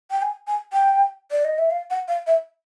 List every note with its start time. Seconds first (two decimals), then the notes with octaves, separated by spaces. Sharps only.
0.11 G5
0.22 G#5
0.47 G#5
0.73 G5
1.31 D5
1.45 D#5
1.58 E5
1.70 F5
1.90 F#5
2.08 F5
2.27 E5